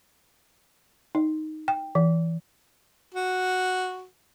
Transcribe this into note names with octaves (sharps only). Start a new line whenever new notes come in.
D#4
G5
E3
F#4